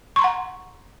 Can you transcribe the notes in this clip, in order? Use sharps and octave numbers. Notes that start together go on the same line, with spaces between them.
F#5 A#5 C6 C#6